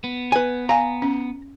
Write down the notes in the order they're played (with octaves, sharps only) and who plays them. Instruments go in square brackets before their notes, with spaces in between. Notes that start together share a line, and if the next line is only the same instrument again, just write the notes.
[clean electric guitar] B3
[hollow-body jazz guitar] B4 G#5
[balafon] F5 G#5 [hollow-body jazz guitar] A#5
[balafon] C#4